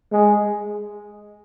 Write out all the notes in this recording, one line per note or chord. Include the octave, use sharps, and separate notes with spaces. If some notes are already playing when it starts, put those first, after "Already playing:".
G#3